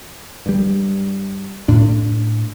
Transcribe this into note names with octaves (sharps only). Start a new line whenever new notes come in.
G2 G3
A2 D4